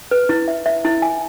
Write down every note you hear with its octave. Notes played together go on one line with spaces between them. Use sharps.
B4
E4
E5
E5
E4
G#5